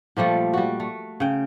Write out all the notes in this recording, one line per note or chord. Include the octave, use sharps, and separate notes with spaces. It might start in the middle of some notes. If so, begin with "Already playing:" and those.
A#2 F3 G3 A3
G3 F#4
A3
C#3 G5